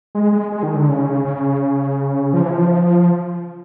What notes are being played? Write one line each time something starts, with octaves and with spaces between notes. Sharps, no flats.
G#3
G#3
G#3
D#3
D3
C#3
C#3
F3
E3
F3